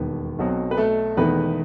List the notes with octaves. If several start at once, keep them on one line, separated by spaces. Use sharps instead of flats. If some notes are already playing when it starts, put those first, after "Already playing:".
Already playing: E1 D#2 D#3 G3 B3
B1 B2 F#3 C4
B4
A3 A4
E1 E2 D#3 A3 B3 B4